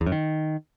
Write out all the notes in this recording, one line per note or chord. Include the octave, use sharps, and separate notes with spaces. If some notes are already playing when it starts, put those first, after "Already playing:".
E2
F#2
D#3